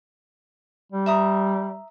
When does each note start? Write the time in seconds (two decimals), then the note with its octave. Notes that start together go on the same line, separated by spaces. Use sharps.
0.92 G3
1.06 E5 A#5 D#6